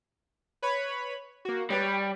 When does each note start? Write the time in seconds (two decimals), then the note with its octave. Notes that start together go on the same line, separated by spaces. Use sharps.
0.62 B4 C#5 B5
1.45 A#3 F#4
1.70 G3 B4 C#5